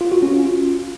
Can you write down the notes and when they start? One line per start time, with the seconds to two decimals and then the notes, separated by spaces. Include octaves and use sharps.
0.01 F4
0.12 F#4
0.22 C#4
0.33 F4